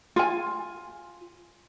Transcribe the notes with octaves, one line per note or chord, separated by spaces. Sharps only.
F4 G#5